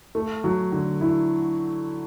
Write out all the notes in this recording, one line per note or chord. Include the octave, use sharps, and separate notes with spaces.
A3
F#3
D3
E4